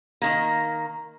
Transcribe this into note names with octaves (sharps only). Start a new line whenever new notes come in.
D#3 A#3